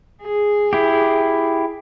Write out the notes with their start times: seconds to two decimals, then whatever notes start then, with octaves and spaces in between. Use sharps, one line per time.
0.22 G#4
0.73 E4 G4